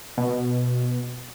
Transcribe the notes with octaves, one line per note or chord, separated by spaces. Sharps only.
B2